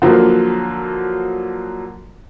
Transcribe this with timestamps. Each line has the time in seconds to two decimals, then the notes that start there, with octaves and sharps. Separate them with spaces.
0.02 D3 F3 F#3 A#3